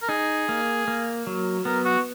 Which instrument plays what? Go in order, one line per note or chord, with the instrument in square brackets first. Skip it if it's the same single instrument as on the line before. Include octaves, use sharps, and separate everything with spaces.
[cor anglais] A#4
[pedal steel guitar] D#4 [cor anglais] G#4
[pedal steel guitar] A#3
A#3
F#3
[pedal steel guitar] B3 [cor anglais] A#4
[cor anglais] F#4